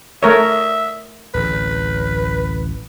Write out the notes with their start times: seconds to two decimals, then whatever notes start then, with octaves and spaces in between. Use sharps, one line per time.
0.23 A3 A#4 C#5 E5
1.34 D1 A1 B4